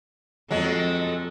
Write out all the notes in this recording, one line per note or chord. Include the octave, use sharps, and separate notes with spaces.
F2 F#3 G#3 A4